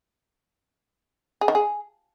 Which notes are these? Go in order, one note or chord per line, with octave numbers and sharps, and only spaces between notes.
G#4
D#3
G#4